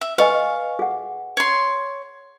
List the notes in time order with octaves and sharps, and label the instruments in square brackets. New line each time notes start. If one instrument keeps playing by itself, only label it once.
[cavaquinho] E5
[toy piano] B4 D#5 G#5 [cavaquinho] F5 C#6
[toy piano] G#4 F#5
[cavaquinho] C#5 C6